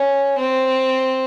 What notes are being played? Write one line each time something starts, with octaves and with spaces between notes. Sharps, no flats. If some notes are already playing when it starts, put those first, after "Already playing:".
Already playing: C#4
C4